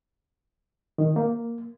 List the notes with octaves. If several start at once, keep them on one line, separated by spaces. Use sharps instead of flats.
D#3
A#3